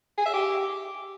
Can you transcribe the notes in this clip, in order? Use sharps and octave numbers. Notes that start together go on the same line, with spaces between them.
G#4
E5
G4